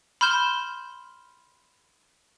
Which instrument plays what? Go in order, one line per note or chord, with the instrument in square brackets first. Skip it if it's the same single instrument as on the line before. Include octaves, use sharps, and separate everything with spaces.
[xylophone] B5 C6 F6 G6 E7 G7